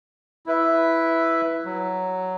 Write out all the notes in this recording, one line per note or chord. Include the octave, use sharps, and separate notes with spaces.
E4 B4 E5
F#3